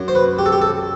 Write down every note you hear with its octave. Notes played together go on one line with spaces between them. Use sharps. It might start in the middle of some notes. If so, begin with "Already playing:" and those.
Already playing: F#2 F#3
C5
B4
G4
A4
G4
A4